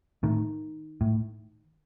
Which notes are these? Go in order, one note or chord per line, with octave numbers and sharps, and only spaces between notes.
A2 D#3
A2